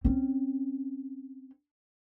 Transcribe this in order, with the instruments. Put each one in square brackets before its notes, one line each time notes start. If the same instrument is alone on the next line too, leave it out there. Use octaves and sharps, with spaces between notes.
[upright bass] C4 C#4